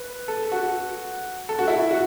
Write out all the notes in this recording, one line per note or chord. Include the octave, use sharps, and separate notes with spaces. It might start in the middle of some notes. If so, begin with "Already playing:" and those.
Already playing: B4
A4
F#4
A4
F#4
E4
F#4